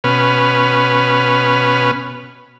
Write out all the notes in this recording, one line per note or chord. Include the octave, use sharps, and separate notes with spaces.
B2 C#4 B4 F6